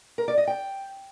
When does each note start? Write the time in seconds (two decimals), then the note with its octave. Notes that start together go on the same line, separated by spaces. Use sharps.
0.18 A#4
0.28 D5
0.38 D#5
0.47 G5